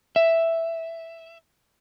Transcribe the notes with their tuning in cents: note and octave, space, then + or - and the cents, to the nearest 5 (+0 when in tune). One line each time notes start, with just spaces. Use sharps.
E5 +0